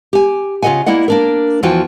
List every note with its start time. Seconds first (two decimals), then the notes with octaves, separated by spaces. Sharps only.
0.13 G4 G#5
0.62 C#3 F4 A#4 D#5 F#5 G#5
0.86 A#3 E4 D5 D#5 F#5
1.08 A#3 D4 A#4
1.63 E2 E3 F3 F4 F#4 G5